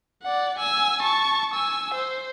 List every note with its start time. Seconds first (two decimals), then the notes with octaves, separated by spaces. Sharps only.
0.23 D5 F#5
0.59 G#5 E6
1.03 A5 C#6
1.54 G#5 E6
1.94 C5